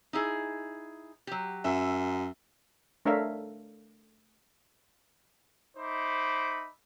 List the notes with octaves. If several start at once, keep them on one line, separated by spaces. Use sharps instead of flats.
D#4 E4 G#4
F#3 G4
F#2 E5
A3 D4 A#4 C#5 E5 F5
D#4 C5 E5 B5 D6